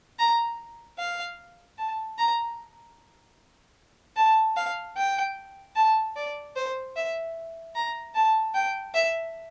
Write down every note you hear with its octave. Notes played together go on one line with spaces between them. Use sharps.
A#5
F5
A5
A#5
A5
F5
G5
A5
D5
C5
E5
A#5
A5
G5
E5